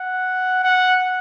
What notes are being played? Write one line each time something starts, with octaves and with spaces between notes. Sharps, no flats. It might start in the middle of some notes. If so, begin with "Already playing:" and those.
Already playing: F#5
F#5